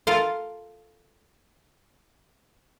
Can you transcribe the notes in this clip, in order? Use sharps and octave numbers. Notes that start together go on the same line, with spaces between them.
F4 A4 A#4 F5